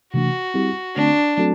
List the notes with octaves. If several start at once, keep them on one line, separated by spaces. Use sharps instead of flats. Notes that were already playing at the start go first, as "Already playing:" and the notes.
C3 E3 A3 D4 F#4
G3 C4 E4 G4
D3 A3 C4 D4
F#3 A3 C4 F#4 A4